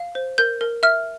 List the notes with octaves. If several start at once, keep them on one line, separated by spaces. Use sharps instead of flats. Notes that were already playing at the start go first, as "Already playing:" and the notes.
Already playing: F5
C5
A#4 G6
A#4
E5 F6